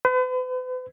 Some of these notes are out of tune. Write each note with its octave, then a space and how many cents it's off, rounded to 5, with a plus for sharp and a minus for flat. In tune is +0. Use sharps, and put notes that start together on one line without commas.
B4 +45